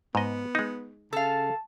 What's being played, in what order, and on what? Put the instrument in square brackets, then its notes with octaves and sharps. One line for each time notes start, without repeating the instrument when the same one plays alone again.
[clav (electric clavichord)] G#2 D#5 [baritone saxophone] B3
[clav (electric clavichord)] G#3 D#4
[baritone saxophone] C#3 [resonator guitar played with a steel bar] A4 F5 [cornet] A5